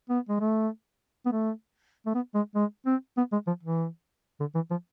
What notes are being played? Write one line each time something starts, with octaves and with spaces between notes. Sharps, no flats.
B3
G#3
A3
B3
A3
A3
B3
G#3
G#3
C4
B3
G#3
F3
E3
D3
E3
F3